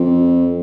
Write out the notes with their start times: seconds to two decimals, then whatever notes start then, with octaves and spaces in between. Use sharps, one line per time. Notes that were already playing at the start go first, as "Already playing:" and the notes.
Already playing: F2